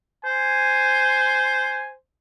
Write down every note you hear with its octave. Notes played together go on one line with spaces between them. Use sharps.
C5 G#5